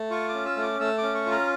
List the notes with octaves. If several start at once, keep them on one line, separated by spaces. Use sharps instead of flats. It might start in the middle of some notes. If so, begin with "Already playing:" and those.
Already playing: A3
F4 C#6
C#4 D6
E6
A3
D6
A3 E6
C#4 D6
C#6
F4
A#5